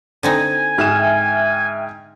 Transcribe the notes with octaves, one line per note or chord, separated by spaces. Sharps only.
D3 C4 D#4 G#5
G#2 E5 G5 F6 E7